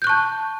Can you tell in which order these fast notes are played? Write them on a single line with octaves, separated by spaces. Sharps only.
G6 F#6 C#6 A5